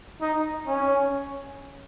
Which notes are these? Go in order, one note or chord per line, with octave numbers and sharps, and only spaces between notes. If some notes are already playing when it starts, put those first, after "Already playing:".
D#4
C#4